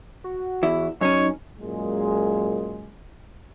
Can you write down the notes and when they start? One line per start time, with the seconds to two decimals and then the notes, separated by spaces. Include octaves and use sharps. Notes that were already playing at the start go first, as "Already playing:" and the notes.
0.24 F#4
0.63 E2 E4
1.01 F#2 C#4 D#4 C#5
1.60 F#2 A#2 G#3